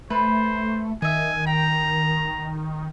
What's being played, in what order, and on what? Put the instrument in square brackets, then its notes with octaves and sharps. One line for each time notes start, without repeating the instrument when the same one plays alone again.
[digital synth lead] A3 [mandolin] B4 [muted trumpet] C5
[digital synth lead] D#3 [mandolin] D#5 E5 [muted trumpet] G#5
[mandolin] G5 [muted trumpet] A#5